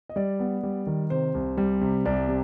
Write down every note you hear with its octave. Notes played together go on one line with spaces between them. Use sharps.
D#5
G3 D5
B3
G3
D#3
C3 C5
C2
G3
C3
C2 D5
C3